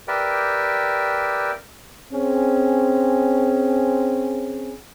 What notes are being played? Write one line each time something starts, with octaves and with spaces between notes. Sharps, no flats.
G4 A#4 B4 D5 E5 G5
C4 C#4 G#4